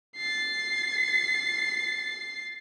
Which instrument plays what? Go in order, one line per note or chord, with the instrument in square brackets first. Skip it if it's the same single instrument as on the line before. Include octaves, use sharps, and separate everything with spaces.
[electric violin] A6 C7